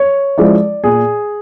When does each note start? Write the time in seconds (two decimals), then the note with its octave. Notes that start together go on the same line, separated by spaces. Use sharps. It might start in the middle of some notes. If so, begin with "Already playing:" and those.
Already playing: C#5
0.38 F3 G#3 C#4 E4 D5
0.84 A#2 G#4